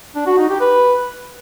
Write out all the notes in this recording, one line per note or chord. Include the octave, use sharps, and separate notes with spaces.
D4
F#4
D#4
G4
B4